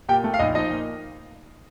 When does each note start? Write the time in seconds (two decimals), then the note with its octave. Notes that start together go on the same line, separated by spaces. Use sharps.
0.09 A#2 G4 G5
0.24 A3
0.34 F5
0.39 A#1 D#4 D#5
0.54 F3 D#4 D#5
0.70 A#2